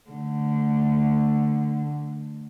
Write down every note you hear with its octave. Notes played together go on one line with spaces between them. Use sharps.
D3 A3